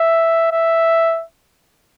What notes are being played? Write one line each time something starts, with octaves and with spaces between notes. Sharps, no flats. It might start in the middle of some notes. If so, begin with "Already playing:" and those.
Already playing: E5
E5